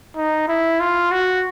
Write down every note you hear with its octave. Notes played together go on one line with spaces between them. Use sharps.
D#4
E4
F4
F#4